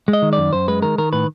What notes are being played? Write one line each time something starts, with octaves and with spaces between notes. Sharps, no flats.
G#3
D#5
D#3
D5
F#2
F#2 C5
G#3 B4
D#3 A#4
D#3 A#4
A2 B4